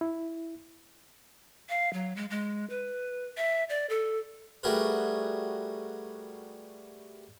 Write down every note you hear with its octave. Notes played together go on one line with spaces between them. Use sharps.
E4
F5
F#3
G#3
G#3
B4
E5
D5
A4
G3 A3 F#4 G#4 A#4 B4